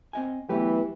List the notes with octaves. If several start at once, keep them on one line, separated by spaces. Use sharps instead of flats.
C4 D#5 G#5
E3 F#3 A3 B3 G4 B4